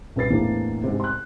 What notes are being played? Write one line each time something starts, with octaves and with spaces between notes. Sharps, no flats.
C2 C#4 B4 A6 C7
E2 A2 E3 A#3 C4 D4
G#2 C3
C6 F#6